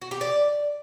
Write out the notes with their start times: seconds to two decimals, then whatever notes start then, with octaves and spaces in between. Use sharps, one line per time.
0.02 F#4
0.11 G4
0.21 D5